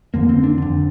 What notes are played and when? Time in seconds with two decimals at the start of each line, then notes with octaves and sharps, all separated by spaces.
0.14 F2 D3 A#3
0.29 C4
0.44 D4
0.58 F2 D3